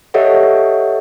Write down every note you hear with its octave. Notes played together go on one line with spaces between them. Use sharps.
G4 A4 C#5 D#5 E5 F#5